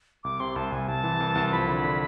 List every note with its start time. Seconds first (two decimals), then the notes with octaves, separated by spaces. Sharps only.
0.24 C2 D6
0.40 C3 C6
0.56 C2 A5
0.72 C2 G#5
0.88 C2 A5
1.04 E3
1.20 C2
1.35 C2
1.52 F3 B5
1.68 D3
1.84 D3